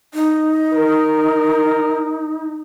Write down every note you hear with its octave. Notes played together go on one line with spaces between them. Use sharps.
D#4
A#4